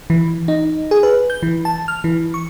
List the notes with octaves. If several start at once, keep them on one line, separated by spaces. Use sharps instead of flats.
E3
D#4
G#4
B4
G6
E3
A5
F6
E3
C#6